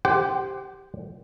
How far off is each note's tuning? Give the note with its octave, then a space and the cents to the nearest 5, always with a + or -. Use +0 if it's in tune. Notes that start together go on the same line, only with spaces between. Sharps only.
G4 +0 C5 +0 F#5 +40